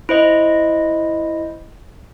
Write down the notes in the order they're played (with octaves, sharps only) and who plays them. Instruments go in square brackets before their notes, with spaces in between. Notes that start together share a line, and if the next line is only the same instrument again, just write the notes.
[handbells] E4 C5 D#5